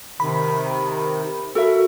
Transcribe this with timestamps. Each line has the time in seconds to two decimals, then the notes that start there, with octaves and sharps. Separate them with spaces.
0.20 C3 D#3 B5
1.55 F#4 A4 A#4 E5